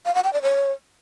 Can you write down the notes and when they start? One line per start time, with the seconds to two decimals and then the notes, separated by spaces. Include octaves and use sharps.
0.06 F5
0.15 F#5
0.24 G5
0.33 D5
0.42 C#5